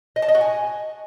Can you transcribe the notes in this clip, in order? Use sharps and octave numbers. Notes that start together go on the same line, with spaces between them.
D#5
A5
D#5
F#4
G#5